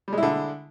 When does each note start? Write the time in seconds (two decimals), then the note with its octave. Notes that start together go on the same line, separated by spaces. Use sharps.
0.08 G3
0.13 G#3
0.18 E4
0.23 D3